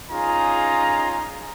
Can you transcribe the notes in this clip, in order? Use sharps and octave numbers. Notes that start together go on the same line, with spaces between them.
C#4 D#4 F4 G#4 A#5